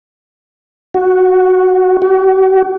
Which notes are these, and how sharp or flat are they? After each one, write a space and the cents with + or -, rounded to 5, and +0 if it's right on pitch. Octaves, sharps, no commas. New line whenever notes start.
F#4 +0
F#4 +45